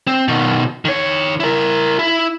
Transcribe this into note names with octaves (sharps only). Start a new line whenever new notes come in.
C4
B2 D#3
D#3 C#5
E4 A#4
E4